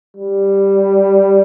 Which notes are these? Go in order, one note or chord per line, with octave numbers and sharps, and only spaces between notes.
G3